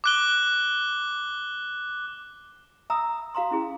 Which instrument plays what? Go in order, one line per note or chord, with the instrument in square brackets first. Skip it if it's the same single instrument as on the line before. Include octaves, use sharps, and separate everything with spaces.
[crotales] D6 F#6 G7
[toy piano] E5 A#5 B5 D#6 E6
F#4 F5 A#5 C6
C#4 E4 G#4